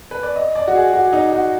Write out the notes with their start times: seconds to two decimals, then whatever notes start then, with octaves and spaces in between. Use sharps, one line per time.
0.11 B4
0.23 D5
0.36 D#5
0.55 D5
0.68 F#4
0.75 G#4
0.93 F#4
1.13 D#4
1.32 F#4